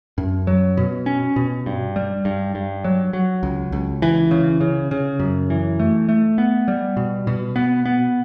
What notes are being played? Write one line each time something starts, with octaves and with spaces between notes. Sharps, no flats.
F#2
F#3
B2
C#4
B2
G2
G3
G2
G2
F#3
F#3
C#2
C#2
E3
C#3
C#3
C#3
F#2
E3
A3
A3
B3
G3
B2
B2
B3
B3